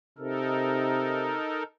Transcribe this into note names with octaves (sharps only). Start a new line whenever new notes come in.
C3 D#4 A4 A#4